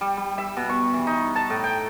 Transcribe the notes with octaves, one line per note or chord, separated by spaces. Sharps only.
G3
G3
E5
B2
C#6
E3
D#4
A5
A2
G5